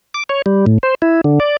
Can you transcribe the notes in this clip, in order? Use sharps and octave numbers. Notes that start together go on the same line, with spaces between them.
D6
C#5
G3
A2
C5
E4
D3
D5